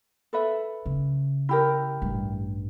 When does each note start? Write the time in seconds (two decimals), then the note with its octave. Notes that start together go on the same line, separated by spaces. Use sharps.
0.33 A4 B4 E5
0.86 C#3
1.49 E4 G4 A#4
2.02 A1 G2